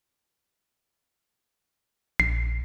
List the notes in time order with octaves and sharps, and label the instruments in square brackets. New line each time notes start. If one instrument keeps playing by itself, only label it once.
[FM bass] A#1 [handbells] C7